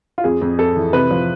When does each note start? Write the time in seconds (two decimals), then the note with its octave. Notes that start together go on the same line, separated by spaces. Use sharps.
0.18 F4
0.24 F2 G#4
0.41 F2
0.59 F2 A4
0.76 E3
0.93 C3 B4
1.11 F3